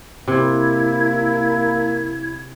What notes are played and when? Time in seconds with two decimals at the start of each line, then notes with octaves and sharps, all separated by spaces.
0.28 C3 A#3 E4 G#6